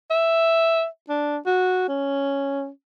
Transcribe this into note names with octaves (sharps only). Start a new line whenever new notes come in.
E5
D4
F#4
C#4